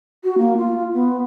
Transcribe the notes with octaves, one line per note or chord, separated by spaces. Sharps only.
F#4
A#3
F4
B3